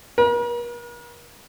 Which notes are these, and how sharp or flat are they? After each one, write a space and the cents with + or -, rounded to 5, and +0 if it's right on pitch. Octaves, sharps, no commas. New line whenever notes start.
A#4 +45